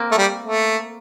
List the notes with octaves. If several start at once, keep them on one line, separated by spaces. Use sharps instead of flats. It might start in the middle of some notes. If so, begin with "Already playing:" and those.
Already playing: A#3 C4
A3
G3
A3